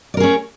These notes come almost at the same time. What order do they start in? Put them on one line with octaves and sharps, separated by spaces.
D5 A#4 G#4 C#4